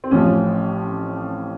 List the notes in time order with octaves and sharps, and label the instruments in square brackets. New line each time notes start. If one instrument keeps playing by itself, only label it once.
[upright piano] C4
A1 A2 F3 C#4